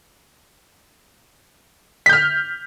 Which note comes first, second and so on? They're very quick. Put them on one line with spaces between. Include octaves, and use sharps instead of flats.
B6 G6 F6